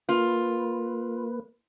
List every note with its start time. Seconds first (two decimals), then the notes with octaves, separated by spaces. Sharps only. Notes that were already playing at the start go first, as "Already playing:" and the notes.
0.09 A#3 F4 B4